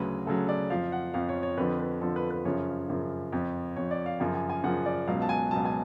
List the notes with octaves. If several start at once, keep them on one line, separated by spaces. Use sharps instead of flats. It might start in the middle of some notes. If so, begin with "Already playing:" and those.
Already playing: D2 C#3 F#3 B4
D2 C#3 F#3 A4
D5
F2 F3 F5
F#5
F2 F3 F5
C#5
C#5
F2 D3 F3 B4
B4
F2 D3 F3 A4
B4
B4
F#2 C#3 F3 C#5
F#2 C#3 F3
F2 F3
F2 F3 C#5
D5
F5
F#2 C#3 F3 G#5
G#5
G#5
F#2 C#3 F3 F#5
D5
C#2 B2 F#3 F5
A5
G#5
C#2 B2 F#3 A5
G#5